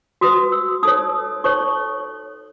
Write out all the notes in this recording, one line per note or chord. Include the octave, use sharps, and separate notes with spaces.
F#4 B4 D#6
E6
D#4 A4 C#5 D#6
D#4 A4 C#5 C#6